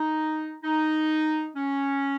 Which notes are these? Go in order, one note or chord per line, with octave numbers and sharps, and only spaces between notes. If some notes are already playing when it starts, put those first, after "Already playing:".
Already playing: D#4
D#4
C#4